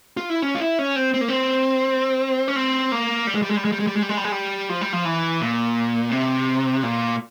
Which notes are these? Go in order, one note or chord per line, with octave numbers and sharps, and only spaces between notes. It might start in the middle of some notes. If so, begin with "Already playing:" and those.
F4
E4
C#4
F4
E4
C#4
C4
C4
A#3
C4
C#4
C4
A#3
G3
G#3
G3
G#3
G3
G#3
G3
G#3
G3
G#3
G3
G#3
G3
G#3
G3
F3
G3
F3
E3
A#2
C3
A#2